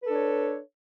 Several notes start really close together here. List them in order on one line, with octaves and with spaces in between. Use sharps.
B4 A4 D4 C#5